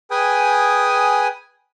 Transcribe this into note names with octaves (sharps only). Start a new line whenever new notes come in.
G#4 B4 G5 G#5 D#6